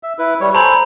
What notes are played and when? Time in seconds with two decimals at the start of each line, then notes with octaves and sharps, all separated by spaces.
0.03 E5
0.19 E4 B4
0.40 G3 C#5
0.55 A4 C5 G#5 A#5 B5